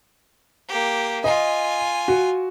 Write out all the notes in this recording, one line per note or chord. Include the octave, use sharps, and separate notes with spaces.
A#3 G4
F4 D#5 G#5
F#4